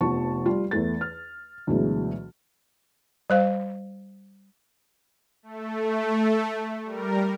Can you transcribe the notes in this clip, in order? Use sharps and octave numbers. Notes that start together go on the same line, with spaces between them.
F1 F3 B3 A5 C#6
G3 F4
E2 A3 A6
F6
D2 B2 E3 F#3 G#3
G3 C5 F5
A3
G3 A#4